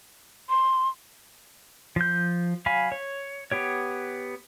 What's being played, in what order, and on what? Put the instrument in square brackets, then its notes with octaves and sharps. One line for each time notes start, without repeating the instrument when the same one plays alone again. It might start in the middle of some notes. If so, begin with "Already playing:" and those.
[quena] C6
[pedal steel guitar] F3 G6
F#3 F5 G#5 B5
C#5
B3 G4 C#5